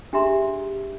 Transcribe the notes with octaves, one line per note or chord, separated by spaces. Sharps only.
D4 G4 G#4 E5 A#5 C6